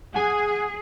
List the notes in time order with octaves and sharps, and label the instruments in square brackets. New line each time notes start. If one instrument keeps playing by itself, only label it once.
[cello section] G#4 [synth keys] F#5 G#5 D#7